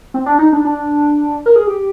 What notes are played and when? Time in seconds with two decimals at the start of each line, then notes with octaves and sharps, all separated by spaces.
0.14 C4
0.26 D4
0.39 D#4
0.53 D4
0.65 D4
1.46 A#4
1.56 G#4
1.67 G4